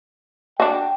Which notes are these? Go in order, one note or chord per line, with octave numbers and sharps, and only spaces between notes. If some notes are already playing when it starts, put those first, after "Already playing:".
D4 F#4 G5